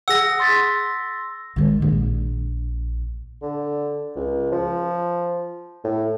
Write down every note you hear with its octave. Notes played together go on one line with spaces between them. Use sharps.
G#4 F#5 E6 A#6
C6 A6 B6
D#3 G#3
A#1
D3
C#2
F3
A2